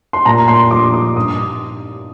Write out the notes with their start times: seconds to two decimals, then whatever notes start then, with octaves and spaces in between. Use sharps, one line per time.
0.13 C6
0.25 A#2 A#5
0.48 C6
0.71 F3 D6
0.94 D6
1.16 G2 D#6